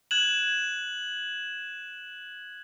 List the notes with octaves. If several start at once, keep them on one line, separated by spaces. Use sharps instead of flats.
F#6 G#6 E7 F#7